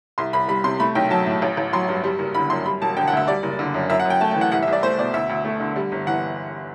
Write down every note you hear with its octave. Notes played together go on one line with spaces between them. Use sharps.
C2 C6
C2 B5
G3 B5
C3 C6
A3 B5
B1 G5
F#3 A5
A2
A1
A1
F#3 C6
G2
G3
F#1
D3 B5
F#2 C6
G3 B5
E1 A5
D3 G5
F#5
D2 E5
G3 D5
F#1
D3
F#2
F#2 E5
F#5
F#2
G5
A3 A5
G5
E3
F#5
C2 F#5
E5
C2 D5
A3 C5
B2 D5
D2 E5
D2
A3
D3
G3
G1
E3 F#5